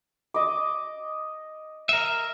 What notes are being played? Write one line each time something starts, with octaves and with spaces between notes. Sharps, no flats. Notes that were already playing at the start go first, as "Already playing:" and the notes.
D#5 D6
A#4 E5